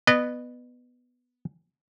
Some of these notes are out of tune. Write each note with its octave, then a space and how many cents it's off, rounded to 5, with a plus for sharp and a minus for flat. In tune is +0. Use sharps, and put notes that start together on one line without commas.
B3 +0 D#5 -40